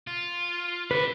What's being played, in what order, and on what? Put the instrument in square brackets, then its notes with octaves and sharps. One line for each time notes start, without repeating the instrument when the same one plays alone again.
[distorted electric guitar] F4
[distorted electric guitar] D3 [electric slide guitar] B4